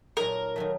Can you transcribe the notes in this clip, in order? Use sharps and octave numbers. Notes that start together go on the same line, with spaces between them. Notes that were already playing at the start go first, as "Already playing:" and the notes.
A#2 F#3 A3 D#4 F#4 A#4
D#3 F#3 A3